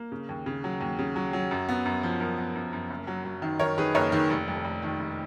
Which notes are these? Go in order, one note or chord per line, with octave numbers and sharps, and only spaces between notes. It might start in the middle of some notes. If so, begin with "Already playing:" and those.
Already playing: A#3
C#3
D#2
C#3
F#3
D#2
C#3
F#3
F#3
F#2
B3
F#2
F3
F#2 A#4
B3
F#2
F#2
F#1
F#3
F#3
D#3
D#3 A#4 C#5
D#3 G#4 B4
F#1 A#4 C#5
D#3
F1
F2
F1
D#3
F1